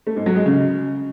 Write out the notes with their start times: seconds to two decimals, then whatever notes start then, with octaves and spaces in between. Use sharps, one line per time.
0.07 A3
0.16 G#2
0.26 F#3
0.36 G#3
0.46 C#3